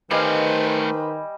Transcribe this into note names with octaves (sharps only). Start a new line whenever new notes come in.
D#3 G3 A3 B4 C5 D#5 F5 G#5